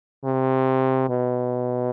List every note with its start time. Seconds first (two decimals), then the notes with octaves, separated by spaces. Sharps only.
0.25 C3
1.09 B2